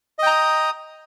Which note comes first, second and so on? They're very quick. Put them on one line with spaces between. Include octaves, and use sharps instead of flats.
D#5 G5 A#5 D#6